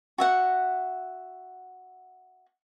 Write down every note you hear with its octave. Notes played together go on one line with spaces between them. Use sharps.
F#4 E5 F#5